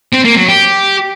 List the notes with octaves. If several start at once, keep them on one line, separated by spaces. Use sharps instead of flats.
C4
A#3
F#3
G4